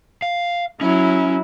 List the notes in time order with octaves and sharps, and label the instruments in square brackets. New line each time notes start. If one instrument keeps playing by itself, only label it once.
[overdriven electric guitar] F5
[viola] F#3 E4 [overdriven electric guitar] C#4